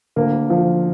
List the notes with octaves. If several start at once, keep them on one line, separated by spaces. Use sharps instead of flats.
D2 A#3
F3